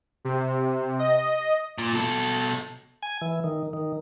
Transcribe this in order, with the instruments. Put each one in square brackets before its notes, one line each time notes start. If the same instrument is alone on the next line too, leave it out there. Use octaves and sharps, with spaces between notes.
[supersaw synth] C3
D#5
[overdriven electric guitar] A#2
B2 A4
[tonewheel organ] G#5
E3
D#3
D#3